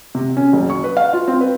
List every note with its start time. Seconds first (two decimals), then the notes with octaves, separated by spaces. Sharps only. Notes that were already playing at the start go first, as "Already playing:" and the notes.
0.15 C3
0.37 C#4
0.53 F#1
0.70 C#6
0.84 B4
0.97 F5
1.13 F4
1.28 C4
1.41 B4